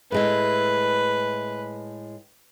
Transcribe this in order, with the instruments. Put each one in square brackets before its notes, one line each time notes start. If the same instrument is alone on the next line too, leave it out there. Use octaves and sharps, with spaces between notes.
[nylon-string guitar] A2 G#3 E4 [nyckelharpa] B4